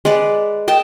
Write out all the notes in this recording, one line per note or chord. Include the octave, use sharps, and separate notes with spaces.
G#3 B4 D5
D#5 G5 A5